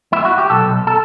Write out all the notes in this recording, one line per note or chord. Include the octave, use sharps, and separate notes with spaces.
E4
F#4
G4
B1 A4
B1
A4